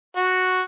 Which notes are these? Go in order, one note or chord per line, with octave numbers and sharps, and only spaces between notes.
F#4